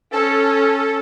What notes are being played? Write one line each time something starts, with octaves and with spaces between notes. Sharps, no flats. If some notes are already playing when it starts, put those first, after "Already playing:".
C#4 A4